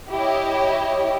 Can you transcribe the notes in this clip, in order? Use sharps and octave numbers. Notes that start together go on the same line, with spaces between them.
E4 G4 C#5 D#5